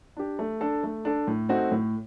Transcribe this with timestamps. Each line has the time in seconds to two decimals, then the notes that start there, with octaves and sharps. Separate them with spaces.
0.17 D4 G4
0.39 A3
0.61 D4 A4
0.83 A3
1.05 D4 A4
1.27 A2
1.49 A3 C4 D#4 F#4
1.71 A2